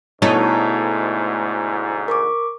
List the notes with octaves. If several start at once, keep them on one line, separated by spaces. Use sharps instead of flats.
D2 G#2 B2 A3 D#4 E4 C#5 A5
A#4 C#6 D6